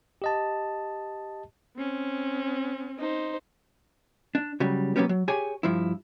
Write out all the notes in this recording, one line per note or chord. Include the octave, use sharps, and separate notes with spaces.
G4 D#5 A5
C4 C#4
D#4 C5
D4
C#3 F#3 G3
F#3 A#3 B3 C#4 G4
F#3
G4 G#4 C#5 G#5
G2 F3 E4